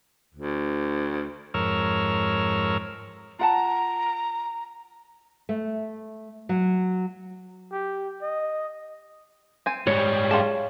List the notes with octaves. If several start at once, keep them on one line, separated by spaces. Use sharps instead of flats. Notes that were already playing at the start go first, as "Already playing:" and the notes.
D2
F2 G#2 A#4 C#5 E6 F6
F4 F#5 A5 A#5
A3
F#3
G4
D#5
C4 G#5
G#2 G3 C#5
F4 G#4 F5 G5 A5